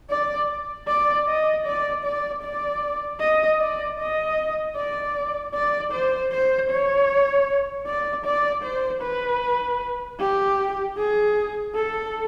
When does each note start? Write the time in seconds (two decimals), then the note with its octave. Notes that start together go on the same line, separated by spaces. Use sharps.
0.10 D5
0.87 D5
1.27 D#5
1.65 D5
2.04 D5
2.43 D5
3.21 D#5
3.60 D5
3.99 D#5
4.76 D5
5.54 D5
5.93 C5
6.32 C5
6.71 C#5
7.87 D5
8.25 D5
8.64 C5
9.03 B4
10.20 G4
10.97 G#4
11.75 A4